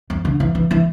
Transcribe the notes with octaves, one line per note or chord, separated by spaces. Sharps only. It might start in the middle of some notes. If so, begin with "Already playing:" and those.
F2
D3
E3
E3
E3